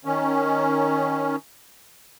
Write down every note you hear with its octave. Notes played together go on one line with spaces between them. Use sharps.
D#3 C#4